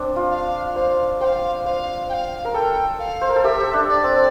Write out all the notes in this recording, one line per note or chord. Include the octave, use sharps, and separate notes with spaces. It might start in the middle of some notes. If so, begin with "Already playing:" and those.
Already playing: C4 D4
F4
F5
C5 F5
C5 F5 G5
C5 F5
G5
F5
A#4
A4 G5
F5
C5
A#4
A4
G4 E5
D4
D5
C4